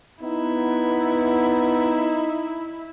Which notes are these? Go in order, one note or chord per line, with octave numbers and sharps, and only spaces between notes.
B3 D#4 E4